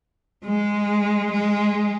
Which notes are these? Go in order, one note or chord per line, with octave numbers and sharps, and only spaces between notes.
G#3
G#3